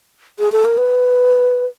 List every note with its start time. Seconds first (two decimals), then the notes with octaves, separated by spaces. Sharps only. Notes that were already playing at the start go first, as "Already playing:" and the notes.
0.39 G#4
0.52 A4
0.65 A#4
0.78 B4